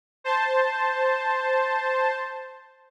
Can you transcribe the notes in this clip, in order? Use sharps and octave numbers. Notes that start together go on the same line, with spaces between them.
C5 A5